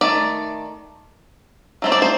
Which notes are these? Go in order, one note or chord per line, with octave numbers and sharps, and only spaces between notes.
D#3 A3 D5
F#3 A3 C4 D#4
D5
C5